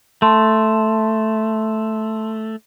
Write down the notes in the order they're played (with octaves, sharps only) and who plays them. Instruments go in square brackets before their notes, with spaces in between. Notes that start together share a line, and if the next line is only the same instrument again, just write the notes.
[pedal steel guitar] A3 [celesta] A5 C6